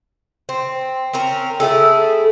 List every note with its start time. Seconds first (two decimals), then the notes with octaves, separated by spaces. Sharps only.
0.49 C4
1.13 C4 C#4 A#4
1.60 A3 E4 G#4 A4